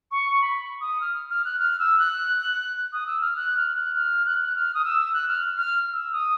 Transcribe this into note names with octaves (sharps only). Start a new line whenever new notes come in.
C#6
B5
D#6
F6
F6
F#6
F6
E6
F#6
D#6
E6
F6
F#6
F6
F#6
F6
F#6
F#6
F6
D#6
E6
F#6
F6
F6
E6
D#6